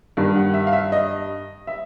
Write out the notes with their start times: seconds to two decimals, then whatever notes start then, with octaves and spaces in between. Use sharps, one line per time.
0.17 G2 D#3
0.36 F#5
0.54 E5
0.67 F5
0.73 E5
0.92 D#5
1.67 E5